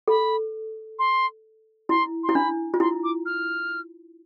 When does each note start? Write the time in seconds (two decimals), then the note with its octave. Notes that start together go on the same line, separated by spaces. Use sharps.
0.08 A4 B5
0.99 C6
1.89 E4 C6
2.23 C6
2.29 E4
2.35 D4 B5
2.74 F4
2.80 E4 C6
3.04 D6
3.26 F6